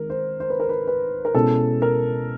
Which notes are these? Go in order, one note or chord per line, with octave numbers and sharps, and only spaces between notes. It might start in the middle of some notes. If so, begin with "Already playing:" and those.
Already playing: D#3 G#3 C4 A#4
C5
C5
B4
A#4
B4
B4
A#4
B2 G#3 C#4 E4 A4
A#4